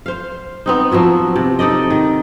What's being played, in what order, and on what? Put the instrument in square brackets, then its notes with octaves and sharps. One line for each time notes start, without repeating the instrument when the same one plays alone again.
[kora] C5 F5
B3 C4 D#4
F3 F#3 E4 F#4
C3
D#4 A4 D5 D#5
D#3